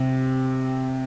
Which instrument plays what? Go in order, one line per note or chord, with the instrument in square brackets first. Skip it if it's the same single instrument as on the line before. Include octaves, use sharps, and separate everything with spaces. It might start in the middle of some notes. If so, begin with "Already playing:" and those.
Already playing: [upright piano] C3 [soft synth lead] C4